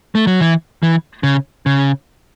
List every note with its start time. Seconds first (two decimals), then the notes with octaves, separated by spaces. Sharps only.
0.15 A3
0.27 F#3
0.41 E3
0.83 E3
1.23 C#3
1.66 C#3